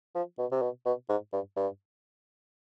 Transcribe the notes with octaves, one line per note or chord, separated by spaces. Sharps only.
F3
B2
C3
B2
B2
G#2
G2
G2